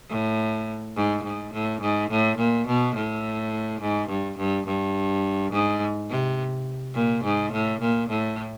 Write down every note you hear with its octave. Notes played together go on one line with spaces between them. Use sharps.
A2
G#2
G#2
A2
G#2
A2
A#2
B2
A2
G#2
G2
G2
G2
G#2
C3
A#2
G#2
A2
A#2
A2